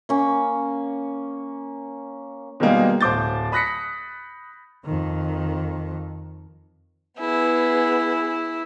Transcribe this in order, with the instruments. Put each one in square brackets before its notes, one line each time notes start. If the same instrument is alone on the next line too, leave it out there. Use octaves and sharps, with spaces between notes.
[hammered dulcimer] A#3 C#4
[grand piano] B2 D#3 G3 G#3 A#3
D1 C5 D6 G6 A6
B5 D#6 F#6 A#6 B6 C#7
[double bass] F2 D#3
[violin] B3 G#4 [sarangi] E4